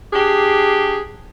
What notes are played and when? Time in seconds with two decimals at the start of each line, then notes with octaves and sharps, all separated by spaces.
0.13 D4 G4 G#4